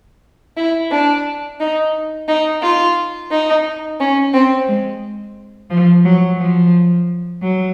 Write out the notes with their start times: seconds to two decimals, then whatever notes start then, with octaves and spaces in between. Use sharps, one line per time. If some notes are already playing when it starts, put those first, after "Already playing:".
0.57 E4
0.92 D4
1.60 D#4
2.28 D#4
2.62 F4
3.31 D#4
4.00 C#4
4.34 C4
4.68 G#3
5.70 F3
6.05 F#3
6.39 F3
7.42 F#3